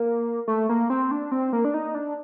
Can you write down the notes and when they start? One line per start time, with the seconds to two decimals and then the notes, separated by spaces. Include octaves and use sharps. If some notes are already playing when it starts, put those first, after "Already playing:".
Already playing: A#3
0.48 A3
0.69 A#3
0.90 C4
1.11 D4
1.32 C4
1.53 A#3
1.65 D4
1.74 D#4
1.95 D4